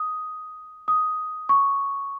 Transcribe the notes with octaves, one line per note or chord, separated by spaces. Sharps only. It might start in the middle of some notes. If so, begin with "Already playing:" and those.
Already playing: D#6
D#6
C#6